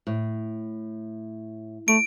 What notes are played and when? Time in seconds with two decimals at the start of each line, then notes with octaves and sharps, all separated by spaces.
0.07 A2
1.88 A3 D7